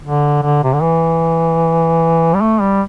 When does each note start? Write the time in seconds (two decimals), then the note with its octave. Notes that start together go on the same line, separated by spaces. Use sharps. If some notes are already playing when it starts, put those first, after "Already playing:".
0.03 D3
0.42 D3
0.63 C3
0.73 D3
0.82 E3
2.34 G3
2.41 A3
2.61 G3